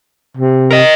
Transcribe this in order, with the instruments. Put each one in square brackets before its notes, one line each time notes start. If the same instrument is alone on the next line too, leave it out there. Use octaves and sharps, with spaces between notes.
[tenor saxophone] C3
[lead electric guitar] A#4 D#5